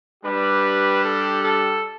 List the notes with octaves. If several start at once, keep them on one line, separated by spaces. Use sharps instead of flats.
G3 D4 G4 B4
A4
A4